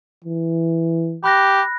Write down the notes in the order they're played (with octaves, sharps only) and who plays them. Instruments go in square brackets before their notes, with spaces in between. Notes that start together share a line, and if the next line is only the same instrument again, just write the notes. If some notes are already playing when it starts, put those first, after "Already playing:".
[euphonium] E3
[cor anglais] G4 [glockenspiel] B5 F#6 A#6